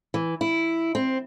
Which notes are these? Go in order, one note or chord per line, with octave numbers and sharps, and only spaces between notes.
E3
E4
C4